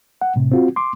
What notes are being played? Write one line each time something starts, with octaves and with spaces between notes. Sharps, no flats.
F#5
A2 C3
C4 F4 F#4
C6 D6